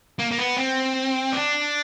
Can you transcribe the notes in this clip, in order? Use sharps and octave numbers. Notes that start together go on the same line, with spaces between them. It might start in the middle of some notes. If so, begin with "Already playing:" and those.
A#3
A#3
B3
C4
D4